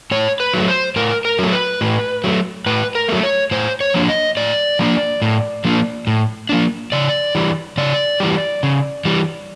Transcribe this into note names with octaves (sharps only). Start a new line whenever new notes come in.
A2 C#5
B4
F#3 A3
C5
A2 A#4
A#4
F#3 A3
B4
A2
F#3 A3
A2 B4
A#4
F#3 A3
C#5
A2 C5
C#5
F3 A#3 D4
D#5
A2 D5
F3 A#3 D4
A2
F3 A#3 D4
A2
F3 A#3 D4
C#3 D5
E3 G3
C#3 D5
E3 G3
C#3
E3 G3